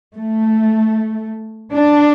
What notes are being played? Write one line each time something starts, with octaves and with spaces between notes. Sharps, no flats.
A3
D4